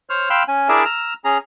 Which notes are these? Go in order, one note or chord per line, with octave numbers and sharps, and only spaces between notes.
C5 C#5 F6
F5 G5 B5 C6 E6 F#6
C#4 G#5
D4 E4 G#4 A#4 D5 E5
A#5 E6 F6
C#4 G#4 A#5